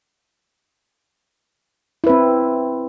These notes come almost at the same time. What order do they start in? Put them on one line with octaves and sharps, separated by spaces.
E4 B4 C4